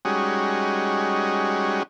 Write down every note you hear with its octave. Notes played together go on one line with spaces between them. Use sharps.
G3 G#3 C#4 D#4 F#4